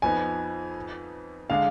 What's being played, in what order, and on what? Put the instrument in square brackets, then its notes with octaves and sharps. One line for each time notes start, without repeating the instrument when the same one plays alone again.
[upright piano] F2 F3 B3 D#4 [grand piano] G#5
[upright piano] D3 G#3 D4 G#4 [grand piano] F5